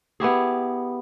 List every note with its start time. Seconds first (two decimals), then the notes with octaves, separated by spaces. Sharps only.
0.20 B3 E4 G4 G#4